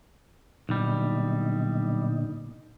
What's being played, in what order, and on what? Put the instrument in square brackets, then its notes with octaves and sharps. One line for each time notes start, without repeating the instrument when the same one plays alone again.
[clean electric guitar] B1 G3 [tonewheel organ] A#2 D3 D#4